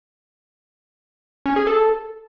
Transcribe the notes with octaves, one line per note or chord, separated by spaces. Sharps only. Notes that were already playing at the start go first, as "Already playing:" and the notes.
C#4
G#4
A4